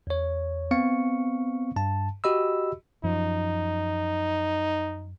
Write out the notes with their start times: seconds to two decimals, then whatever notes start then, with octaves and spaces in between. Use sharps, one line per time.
0.07 E2 C#5
0.71 B3 C4 F5 C#6 C#7
1.76 G2 A5
2.24 F#4 G4 D#5 B5 E6
3.03 F#2 F3 D#4